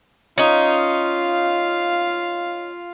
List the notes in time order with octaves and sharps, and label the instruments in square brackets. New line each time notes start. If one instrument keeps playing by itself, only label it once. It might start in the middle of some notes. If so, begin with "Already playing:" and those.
[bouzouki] C#4 D#4 [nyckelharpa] F4 F5